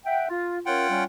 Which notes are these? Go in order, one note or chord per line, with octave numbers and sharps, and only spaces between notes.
E5 F#5 G5
F4
C#4 F4 A#4 C#5 F#5 G5
G3 C#4